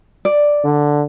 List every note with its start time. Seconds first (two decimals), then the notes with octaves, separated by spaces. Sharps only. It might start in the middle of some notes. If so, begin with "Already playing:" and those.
0.25 D5
0.64 D3